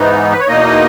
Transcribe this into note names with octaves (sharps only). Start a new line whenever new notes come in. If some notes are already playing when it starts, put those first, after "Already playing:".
Already playing: G#2 E3 B3 D#4
B4
C#5
E2 B2 A#3 D#4 D#5